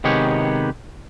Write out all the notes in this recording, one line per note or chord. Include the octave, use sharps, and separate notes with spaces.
C3 D#3 G#3 B3 G4 C#5